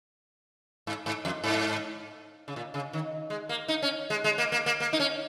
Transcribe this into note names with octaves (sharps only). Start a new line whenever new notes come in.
G#2
G#2
F2
G#2
C#3
A#2
C#3
D#3
G#3
A#3
D#4
C#4
G#3
G#3
A#3
A#3
A#3
A#3
D#4
C#4